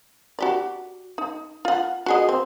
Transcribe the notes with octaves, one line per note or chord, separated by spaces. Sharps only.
F#4 G4 D5
D#4
F4 F#5
F#4 G#4 D#5
C4